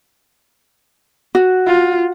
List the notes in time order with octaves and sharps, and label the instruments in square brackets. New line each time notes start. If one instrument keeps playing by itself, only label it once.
[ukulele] F#4
[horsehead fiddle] F4